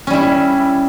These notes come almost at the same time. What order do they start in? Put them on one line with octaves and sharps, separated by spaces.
C#4 G3 E4